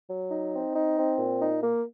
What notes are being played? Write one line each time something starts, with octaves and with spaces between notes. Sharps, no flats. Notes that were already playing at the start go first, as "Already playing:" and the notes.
F#3
D#4
C4
D#4
C4
A#2
D#4
A#3